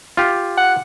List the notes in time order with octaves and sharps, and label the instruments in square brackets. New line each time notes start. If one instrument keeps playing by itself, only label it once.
[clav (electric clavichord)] F4 G4
[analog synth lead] F#5